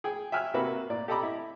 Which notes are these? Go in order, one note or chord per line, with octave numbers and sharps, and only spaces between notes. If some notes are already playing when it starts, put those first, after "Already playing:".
G#4 G5
E5 G5 G#5 F6 F#6
C3 A#3 F#4 B4 E5
A#2 D5
G4 A4 D#5 A#5 B5 D6
E4